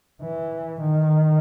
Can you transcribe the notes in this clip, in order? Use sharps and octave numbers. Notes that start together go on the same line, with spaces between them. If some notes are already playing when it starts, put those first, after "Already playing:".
E3
D#3